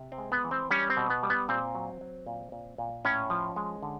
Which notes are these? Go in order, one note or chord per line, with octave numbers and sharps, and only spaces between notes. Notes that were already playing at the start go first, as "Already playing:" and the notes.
Already playing: C3
C4
G#3
B3
E3
C4
G3 C#4
C4
B2
B3
G3
B3
A#2 C4
F#3
F#3
A#2
A#2
A#2
A2 C#4
F3
G#3
D3